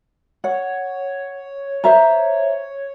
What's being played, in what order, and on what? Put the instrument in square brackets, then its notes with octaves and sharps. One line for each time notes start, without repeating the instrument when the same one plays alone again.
[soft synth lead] C#5 [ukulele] F#5
[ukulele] C5 E5 A#5